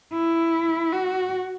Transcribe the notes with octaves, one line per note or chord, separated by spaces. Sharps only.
E4
F#4